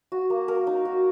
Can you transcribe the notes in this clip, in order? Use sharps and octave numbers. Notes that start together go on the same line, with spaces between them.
F#4
A#3
A#4
D#4
F#4